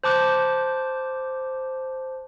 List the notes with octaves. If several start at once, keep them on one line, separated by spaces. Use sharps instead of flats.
C5 A5 D6 F#6 G6